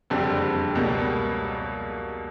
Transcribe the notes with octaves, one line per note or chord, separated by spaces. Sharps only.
F#1 F2 D3 G3 C4
C#2 B2 G3 A#3